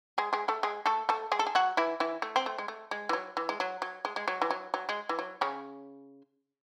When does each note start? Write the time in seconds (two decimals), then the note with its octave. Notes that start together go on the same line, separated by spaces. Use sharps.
0.18 G#3 G#4
0.33 G#3 G#4
0.48 A3 A4
0.63 G#3 G#4
0.86 A3 A4
1.09 A3 A4
1.32 G#3 G#4
1.39 A4
1.47 G#4
1.55 F#3 F#4
1.77 E3 E4
2.00 E3 E4
2.22 A3
2.36 C4
2.46 A3
2.58 G#3
2.68 A3
2.91 G#3
3.09 E3
3.13 F#3
3.37 E3
3.49 G#3
3.60 F#3
3.82 F#3
4.05 G#3
4.16 G#3
4.28 F#3
4.42 E3
4.51 F#3
4.74 F#3
4.89 G#3
5.09 E3
5.19 F#3
5.41 C#3 C#4